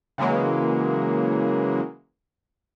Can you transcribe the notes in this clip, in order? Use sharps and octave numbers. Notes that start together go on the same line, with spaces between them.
C#3 E3 F#3 G#3 A#3